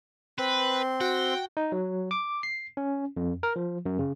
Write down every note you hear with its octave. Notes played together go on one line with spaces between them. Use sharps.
C4 B4 C6
F#4 G5
D#4
F#3
D6
C7
C#4
F2
A#4
F3
F#2
C#3